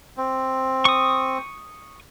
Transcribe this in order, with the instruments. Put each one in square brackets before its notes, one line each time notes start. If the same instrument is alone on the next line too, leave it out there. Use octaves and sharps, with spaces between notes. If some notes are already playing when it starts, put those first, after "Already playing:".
[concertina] C4
[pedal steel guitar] C#6 D#6